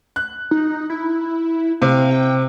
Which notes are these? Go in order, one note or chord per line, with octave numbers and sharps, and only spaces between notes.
F#6
D#4
E4
C3 F5
G5